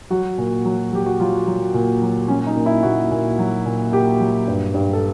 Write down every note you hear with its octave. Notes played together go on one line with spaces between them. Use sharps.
F#3 F#4
A#2
F#3
F#3 G4
F#4
F#3 F4
F#3
A#2
F#3
F#3 C#4
D#4
A#2
E4
A#2 F#4
A#2
F#3
A#2
A#2 G4
F#3
G2
G2
A4